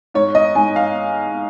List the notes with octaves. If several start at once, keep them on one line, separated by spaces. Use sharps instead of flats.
G#2 C#5
D#5
G#2 G#5
F5